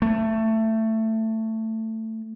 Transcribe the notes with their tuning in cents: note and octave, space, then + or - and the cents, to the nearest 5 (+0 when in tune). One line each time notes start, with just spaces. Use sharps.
A3 +15